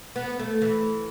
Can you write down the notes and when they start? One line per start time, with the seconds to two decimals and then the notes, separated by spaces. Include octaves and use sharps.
0.16 B3
0.39 A3
0.62 E3